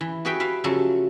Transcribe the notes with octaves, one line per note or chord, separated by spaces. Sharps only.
E3
F#4 G#4 B4 C#5 E5 G5
B4 E5 F5
C#3 F3 F#3 A3 A4